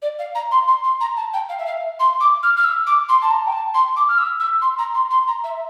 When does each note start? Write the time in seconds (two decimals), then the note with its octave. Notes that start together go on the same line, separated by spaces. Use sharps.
0.02 D5
0.19 F5
0.35 A#5
0.51 C6
0.68 C6
0.84 C6
1.01 A#5
1.17 A5
1.33 G5
1.49 F5
1.59 E5
1.66 F5
1.99 C6
2.20 D6
2.43 F6
2.57 F6
2.64 E6
2.86 D6
3.09 C6
3.22 A5
3.31 A#5
3.47 G5
3.52 A5
3.74 C6
3.96 D6
4.09 F6
4.18 E6
4.40 E6
4.61 C6
4.78 A#5
4.94 C6
5.10 C6
5.28 A#5
5.44 E5